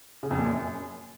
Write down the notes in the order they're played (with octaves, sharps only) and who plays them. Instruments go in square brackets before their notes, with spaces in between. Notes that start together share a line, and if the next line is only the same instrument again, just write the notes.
[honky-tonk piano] C#3
F2
A#2
F#2